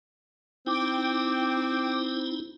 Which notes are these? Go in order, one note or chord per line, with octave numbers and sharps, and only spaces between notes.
C4 D#4 E4 G5 D6